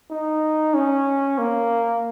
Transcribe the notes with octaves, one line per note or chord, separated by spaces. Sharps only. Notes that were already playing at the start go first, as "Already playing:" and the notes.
D#4
C#4
A#3